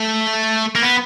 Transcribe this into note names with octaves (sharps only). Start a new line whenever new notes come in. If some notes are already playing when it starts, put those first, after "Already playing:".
Already playing: A3
A#3
B3